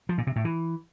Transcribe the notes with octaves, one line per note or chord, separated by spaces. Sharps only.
F3
A#2
C3
A2
E3